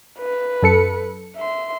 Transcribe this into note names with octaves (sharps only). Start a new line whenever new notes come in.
B4
F#2 A4 C#7
E5 C6